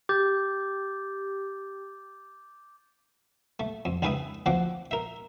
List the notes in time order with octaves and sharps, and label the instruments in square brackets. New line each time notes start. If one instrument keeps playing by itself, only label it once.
[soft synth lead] G4 [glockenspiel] D6 G6 A6
[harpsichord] A3
F2
C#2 D#3 G#4 B4 E5 D#6
D2 F3 C4 F#5 D6
A#4 E5